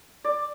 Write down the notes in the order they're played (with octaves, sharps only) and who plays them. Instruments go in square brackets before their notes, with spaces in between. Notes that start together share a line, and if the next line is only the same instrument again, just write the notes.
[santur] D5